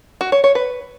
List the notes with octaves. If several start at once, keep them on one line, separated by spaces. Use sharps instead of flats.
F#4
C#5
C#5
B4